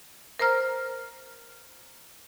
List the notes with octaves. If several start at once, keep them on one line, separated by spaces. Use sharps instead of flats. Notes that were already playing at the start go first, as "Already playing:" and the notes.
A#4 C5 A#5 F6